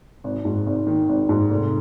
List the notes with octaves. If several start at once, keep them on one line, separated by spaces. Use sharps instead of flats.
G#1
G#2
G#1
D#3
G#1
G#2
F1